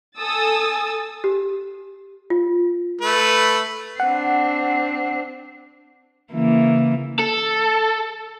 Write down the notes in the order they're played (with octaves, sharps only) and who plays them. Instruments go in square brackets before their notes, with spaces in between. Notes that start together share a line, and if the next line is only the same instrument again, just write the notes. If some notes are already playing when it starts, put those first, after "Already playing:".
[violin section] A4 G#5 D#6 E6 A6
[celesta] G4
F4
[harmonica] A3 B4
[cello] C4 D4 [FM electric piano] F#5
[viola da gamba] C#3 E3 A#3
[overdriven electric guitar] A4